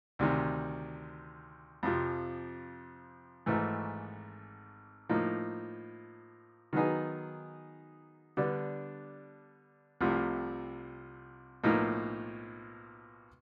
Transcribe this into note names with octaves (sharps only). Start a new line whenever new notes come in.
D2 C3 D#3
F2 C3 F3
G#1 G#2 E3 A3
A2 F3 A#3 D#4
D#3 F#3 B3 D#4 G#4
D3 G3 B3 D4
C2 C3 F3 A3
B1 A2 F3 A#3 D#4